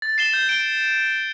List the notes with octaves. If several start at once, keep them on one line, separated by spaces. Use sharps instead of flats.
A6
C7 E7 G7
G6
D7 G7